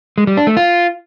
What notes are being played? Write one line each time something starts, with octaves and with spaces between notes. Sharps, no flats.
G#3
G3
D4
A3
F4